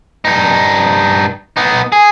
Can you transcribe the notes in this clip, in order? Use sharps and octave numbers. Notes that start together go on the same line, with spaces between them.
G2 D#4
B3 D#4
G#4